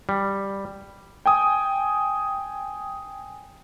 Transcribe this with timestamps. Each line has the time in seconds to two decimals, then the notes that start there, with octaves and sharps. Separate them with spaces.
0.09 G3
1.26 G5 G#5 D#6